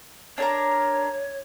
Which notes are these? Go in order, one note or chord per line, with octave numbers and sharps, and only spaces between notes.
D4 A#4 C#5 A#5